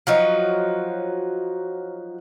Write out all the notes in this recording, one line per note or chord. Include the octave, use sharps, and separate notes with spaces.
F3 F#3 D#4